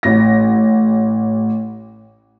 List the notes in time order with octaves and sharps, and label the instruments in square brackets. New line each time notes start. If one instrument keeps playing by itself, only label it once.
[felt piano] A1 A#6